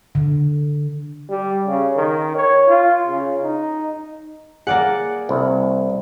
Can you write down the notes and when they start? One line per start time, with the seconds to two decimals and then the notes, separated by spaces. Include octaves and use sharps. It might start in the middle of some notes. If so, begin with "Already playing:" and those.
0.15 D3
1.30 G3
1.66 C#3
1.97 D#3
2.35 C#5
2.68 F4
3.07 C#3
3.43 D#4
4.67 A#3 G#4 D5 F#5
5.29 C2